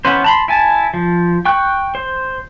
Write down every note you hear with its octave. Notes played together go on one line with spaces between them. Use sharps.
E3 B3 C#4 B4 C5
A5 B5 C6
E4 G#5 A5
F3
G5 C#6 F#6
C5